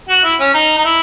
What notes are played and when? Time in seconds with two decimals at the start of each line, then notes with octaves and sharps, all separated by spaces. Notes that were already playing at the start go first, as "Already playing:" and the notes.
0.09 F#4
0.24 E4
0.40 C#4
0.54 D#4
0.78 D#4
0.85 E4